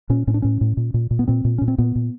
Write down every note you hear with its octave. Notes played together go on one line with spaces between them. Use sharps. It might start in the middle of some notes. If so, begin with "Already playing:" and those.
A#2 C#4
A2 C#4
D4
A2 C#4
A2
A#2
A#2
A#2
B3
A#2 C4
A#2
A#2 C#4
C4
A#2 B3
A#2